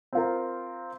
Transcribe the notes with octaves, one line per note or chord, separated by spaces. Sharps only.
C4 F4 A#4